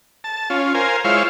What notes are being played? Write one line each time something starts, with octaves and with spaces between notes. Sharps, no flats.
A5
C#4 F4
A#4 C5 F5 G#5
G#3 E4 F4 C5 C#5 F5